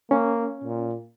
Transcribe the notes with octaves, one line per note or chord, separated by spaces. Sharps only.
A#3 C#4
A#2